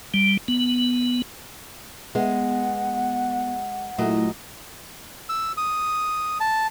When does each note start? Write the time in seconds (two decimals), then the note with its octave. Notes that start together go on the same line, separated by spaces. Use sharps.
0.14 G3
0.48 B3
2.15 G#3 B3 F#5
3.98 A#2 F#3 A3 E4 D#5
5.29 E6
5.57 D#6
6.40 A5